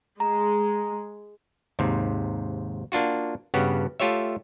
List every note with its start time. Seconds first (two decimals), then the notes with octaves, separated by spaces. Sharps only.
0.20 G#3 A#5
1.79 D#2 G#2 C3
2.92 A#3 D4 F4 F#4
3.54 G2 C#3 B3 F#4 G4
4.00 A3 F4 G4 C#5 E5